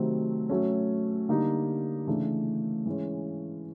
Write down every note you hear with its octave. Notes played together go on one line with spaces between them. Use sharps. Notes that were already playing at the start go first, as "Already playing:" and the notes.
Already playing: C3 D#3 F#3 A3 C4
F#3 A3 C#4
D3 G3 A#3 D#4
C#3 E3 A3 D4
E3 G#3 C#4